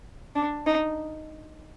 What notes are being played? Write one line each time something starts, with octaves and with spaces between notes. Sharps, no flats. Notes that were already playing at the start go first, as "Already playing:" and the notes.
D4
D#4